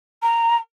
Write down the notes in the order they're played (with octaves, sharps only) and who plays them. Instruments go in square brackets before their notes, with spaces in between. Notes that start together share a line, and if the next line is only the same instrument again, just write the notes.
[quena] A#5